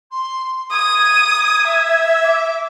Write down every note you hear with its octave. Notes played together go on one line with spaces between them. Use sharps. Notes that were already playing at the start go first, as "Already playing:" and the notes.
C6
D#6 G#6
E5
D6